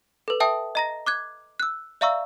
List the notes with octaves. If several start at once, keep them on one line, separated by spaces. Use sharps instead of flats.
A4 B4
E5 G5 A5 D#6
D#5 A#5 A#6
D6 F#6 G#6
E6 F#6
D5 E5 F5 A#5 C#6 E6